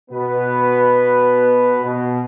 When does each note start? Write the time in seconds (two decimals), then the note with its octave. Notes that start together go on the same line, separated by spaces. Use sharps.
0.11 B2 B3 B4
1.84 B2